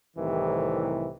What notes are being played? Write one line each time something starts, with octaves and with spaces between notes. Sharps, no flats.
C2 A2 C3 D#3 E3